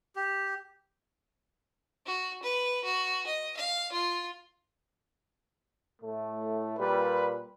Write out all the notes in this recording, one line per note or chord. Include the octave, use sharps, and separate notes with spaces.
G4
F#4
B4
F#4
D#5
F5
F4
A2 A3
A#2 G3 B4